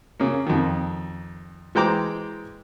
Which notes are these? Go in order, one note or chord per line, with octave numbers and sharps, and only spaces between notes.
C#3 A#3
F2 D#3
E3 G#3 C5 G5 A#5 D6